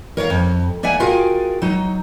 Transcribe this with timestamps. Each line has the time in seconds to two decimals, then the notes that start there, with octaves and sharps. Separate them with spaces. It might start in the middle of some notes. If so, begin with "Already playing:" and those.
0.17 A#4 C#5 D5 F5
0.30 F2
0.83 A#3 D5 E5 F#5 G#5
1.00 F4 F#4 G#4 A#4 F5 G5
1.62 F#3 D#4